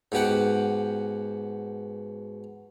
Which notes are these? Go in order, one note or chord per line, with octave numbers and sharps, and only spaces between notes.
G#2 B2 G4 F#5